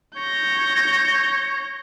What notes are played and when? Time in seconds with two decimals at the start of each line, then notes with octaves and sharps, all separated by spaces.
0.16 C#5 G6 A#6